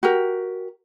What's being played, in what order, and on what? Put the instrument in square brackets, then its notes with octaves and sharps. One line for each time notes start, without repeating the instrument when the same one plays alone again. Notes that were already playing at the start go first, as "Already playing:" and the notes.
[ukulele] F#4 G4 A#4